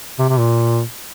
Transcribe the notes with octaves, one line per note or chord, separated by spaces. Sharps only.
C3
C3
A#2